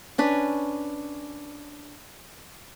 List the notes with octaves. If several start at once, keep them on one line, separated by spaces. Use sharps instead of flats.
C#4 D4 B4